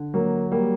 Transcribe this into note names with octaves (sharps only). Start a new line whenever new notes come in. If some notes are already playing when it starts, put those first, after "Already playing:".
Already playing: D3
F#3 A#3
G3 A#3